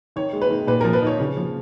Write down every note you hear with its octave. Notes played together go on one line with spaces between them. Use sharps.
D#3 C#5
G#3
B4
D#3
A#2 B4
F3 A#4
B4
D#4 C#5
C#3
F3